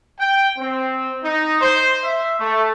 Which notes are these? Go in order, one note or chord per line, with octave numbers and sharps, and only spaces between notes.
G5
C4
D#4
C5
E5
A3